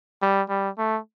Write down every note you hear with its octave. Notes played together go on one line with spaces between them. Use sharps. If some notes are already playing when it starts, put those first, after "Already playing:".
G3
G3
A3